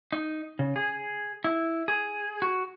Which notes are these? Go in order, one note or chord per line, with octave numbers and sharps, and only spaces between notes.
D#4
C#3
G#4
E4
G#4
F#4